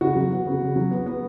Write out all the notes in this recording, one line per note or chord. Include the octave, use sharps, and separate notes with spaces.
C#3 F#4
F#3
B3
C#3
C#3
F#3
B3
B3